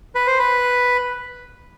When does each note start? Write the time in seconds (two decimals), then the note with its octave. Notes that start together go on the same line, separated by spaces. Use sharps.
0.15 B4
0.27 C5
0.39 B4